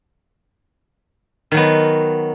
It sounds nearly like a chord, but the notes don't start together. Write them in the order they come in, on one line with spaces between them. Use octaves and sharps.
D#3 F#3 B3